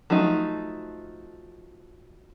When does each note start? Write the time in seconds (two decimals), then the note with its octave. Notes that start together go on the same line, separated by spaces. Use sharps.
0.10 F3 F#3 A3 D#4